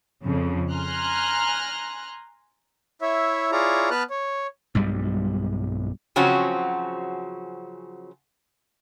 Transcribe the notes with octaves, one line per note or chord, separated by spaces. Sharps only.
F2 C#3
G#5 A#5 C6 F6 F#6
E4 C#5 E5
E4 F4 G#4 C#5 D5 A#5
B3 B4 A5 F6 F#6
C#5
B1 G2 G3 G#3
C#3 F3 F#3 C4 C#4 F#4